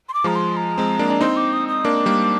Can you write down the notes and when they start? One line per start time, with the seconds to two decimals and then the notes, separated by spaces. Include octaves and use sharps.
0.09 C6
0.14 D6
0.24 F3 G#3 A#5
0.35 C6
0.57 A#5
0.78 G#3 C4
0.99 A#3 D4
1.10 D4
1.21 C4 D#4 C6
1.37 D6
1.53 D#6
1.68 D#6
1.85 A#3 D4 D6
2.06 G3 A#3